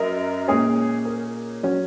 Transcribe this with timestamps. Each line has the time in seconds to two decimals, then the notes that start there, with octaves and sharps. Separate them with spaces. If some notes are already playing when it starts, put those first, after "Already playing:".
Already playing: F#2 A#4 D#5
0.48 A#2 G#3 C#4 G#4 C#5
1.05 A#4
1.63 F#3 C#4